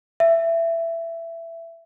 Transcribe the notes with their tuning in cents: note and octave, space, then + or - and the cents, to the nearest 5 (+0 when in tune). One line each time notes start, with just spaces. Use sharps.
E5 +15